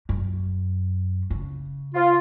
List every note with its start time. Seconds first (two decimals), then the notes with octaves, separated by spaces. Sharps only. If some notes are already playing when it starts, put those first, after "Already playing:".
0.09 F#2
1.30 C#3
1.94 F4